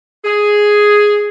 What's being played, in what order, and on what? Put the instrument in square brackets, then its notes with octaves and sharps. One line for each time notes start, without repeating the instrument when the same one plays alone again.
[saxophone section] G#4